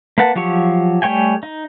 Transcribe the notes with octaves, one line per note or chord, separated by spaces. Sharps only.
A#3 B4 F#5 A5
F3 F#3 G4 C#6
G3 A3 C#5 G5 G#5
D#4